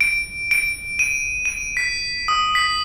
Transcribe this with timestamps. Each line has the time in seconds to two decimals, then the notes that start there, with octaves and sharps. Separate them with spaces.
0.01 D7
0.51 D7
0.99 D#7
1.45 D#7
1.77 B6
2.28 D#6
2.55 B6